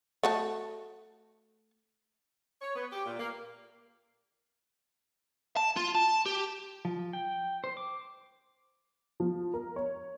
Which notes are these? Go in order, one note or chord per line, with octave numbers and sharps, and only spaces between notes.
A3 F#4 A5
C#5
B3
G4
A#2
A#3
A5
F4
A5
G4
F3
G5
C5
D6
F3
A#4
C#5